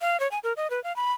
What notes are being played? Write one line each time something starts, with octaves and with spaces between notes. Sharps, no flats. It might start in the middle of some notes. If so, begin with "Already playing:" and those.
F5
C#5
G#5
A#4
D#5
B4
F5
B5